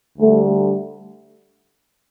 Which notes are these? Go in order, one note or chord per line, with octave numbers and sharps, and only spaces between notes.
D2 D3 G3 A3